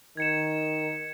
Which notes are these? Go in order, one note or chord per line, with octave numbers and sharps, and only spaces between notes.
D#3 G#6 C#7 E7